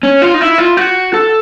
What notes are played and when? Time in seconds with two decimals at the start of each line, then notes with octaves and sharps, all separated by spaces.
0.03 C#4
0.22 F4
0.34 D#4
0.41 E4
0.58 F4
0.77 F#4
1.14 A4